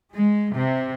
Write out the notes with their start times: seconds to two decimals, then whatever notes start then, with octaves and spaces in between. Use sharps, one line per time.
0.14 G#3
0.53 C3